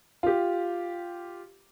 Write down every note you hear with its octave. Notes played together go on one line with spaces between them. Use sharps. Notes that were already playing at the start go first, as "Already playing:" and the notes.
F4 G4